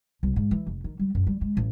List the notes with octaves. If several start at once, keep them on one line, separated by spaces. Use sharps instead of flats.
C2
G#2
E3
F1
D#3
G3
F#2
G3
G#3
A1